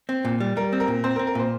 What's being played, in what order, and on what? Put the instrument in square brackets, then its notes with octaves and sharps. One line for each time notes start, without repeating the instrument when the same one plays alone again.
[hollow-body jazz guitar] C4
A#2
G3
[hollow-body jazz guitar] G3 [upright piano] A#4
[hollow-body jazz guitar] C4
[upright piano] A#4
[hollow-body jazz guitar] A#2
[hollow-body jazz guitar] C4 [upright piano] C5
[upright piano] A#4
[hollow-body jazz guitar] C4
[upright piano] A#4
[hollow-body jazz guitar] A#2 [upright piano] C5